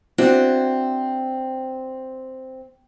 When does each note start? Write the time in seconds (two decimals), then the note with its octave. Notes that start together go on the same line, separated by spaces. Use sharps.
0.18 C4 D4 E4 F#4